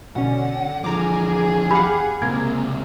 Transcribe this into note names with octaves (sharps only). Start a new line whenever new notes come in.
B2 D3 C#4 F#5
E2 D3 F3 G#4 A#5 D6
G4 F5 F#5 B5
C#2 C3 A#3 A#4 G#6